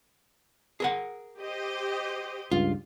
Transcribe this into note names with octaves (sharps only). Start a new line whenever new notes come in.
G#4 A#4 F#5
G4 C5 D#5
C#2 G2 F4